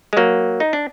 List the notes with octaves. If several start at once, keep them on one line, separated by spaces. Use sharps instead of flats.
G#3
F#3 A#3
D#4
D4